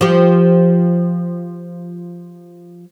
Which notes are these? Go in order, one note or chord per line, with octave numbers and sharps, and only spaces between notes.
F3 G4